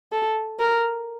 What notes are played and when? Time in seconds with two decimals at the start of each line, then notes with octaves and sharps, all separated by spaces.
0.12 A4
0.59 A#4